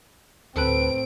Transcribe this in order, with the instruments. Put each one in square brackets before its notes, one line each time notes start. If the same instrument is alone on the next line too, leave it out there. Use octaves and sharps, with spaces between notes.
[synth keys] D2 A4 B4 [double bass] A2 C4 [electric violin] D7